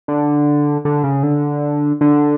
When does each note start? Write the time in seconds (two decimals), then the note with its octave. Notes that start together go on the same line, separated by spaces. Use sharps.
0.08 D3
0.85 D3
1.04 C#3
1.23 D3
2.01 D3